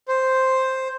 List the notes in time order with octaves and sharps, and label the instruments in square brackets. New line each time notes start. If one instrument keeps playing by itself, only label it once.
[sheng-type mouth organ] C5